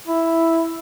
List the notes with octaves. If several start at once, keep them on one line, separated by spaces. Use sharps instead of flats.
E4